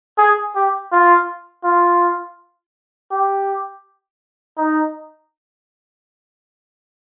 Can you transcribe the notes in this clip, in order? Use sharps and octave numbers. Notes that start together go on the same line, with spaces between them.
G#4
G4
F4
F4
G4
D#4